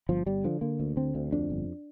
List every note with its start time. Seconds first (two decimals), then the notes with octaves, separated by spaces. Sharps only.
0.09 G1 F3
0.26 G1 G3
0.44 D3 F3
0.61 D3 A#3
0.80 D2
0.97 D3 C4
1.15 D2
1.32 F2 D4
1.50 G1